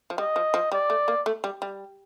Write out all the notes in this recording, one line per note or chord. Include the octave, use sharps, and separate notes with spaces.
F3
G3 D#5
F3
F3
G3 D5
A3
A#3
A3
G3
G3